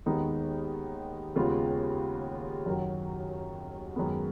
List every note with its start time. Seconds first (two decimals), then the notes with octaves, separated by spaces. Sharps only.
0.06 D#2 D#3 G#3 B3 D#4
1.35 D#2 C#3 G#3 B3 F4
2.66 F#2 D#3 F#3
3.96 F#2 D#3 G#3 B3